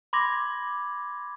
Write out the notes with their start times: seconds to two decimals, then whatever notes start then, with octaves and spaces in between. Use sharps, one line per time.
0.13 B5 C6 D6 G#6 A#6